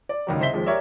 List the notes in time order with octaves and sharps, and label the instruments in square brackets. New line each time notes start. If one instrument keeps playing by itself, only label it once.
[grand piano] D5
C#2 D#3 F#3
C2 C5 D#5 E5 B6 G7
D#2 F3 G#3
G4 A#4 C#5 D5 E5